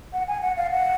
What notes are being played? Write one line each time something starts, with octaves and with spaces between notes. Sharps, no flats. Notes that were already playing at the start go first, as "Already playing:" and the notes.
F#5
G#5
F#5
F5
F#5